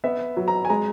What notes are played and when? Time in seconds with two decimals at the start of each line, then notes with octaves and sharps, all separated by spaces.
0.04 B3 E5
0.37 F#3
0.48 A#5
0.65 G#5
0.70 G#3 A#5